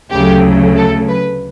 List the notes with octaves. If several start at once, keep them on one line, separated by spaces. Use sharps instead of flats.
D2 C#3 F#3 A3 G4
A4
B4